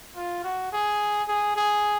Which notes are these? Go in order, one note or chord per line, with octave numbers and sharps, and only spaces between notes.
F4
F#4
G#4
G#4
G#4